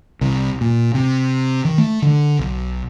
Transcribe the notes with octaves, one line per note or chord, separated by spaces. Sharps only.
C2
A#2
C3
D#3
A3
D3
B1